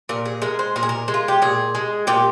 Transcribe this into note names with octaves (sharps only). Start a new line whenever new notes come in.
A#2 A#4
G#4
G#3 A#4
C5
A#2 A#4
G#4
A#4
G#3
F4
G4
A#2 G#4
G#3
A#2 G4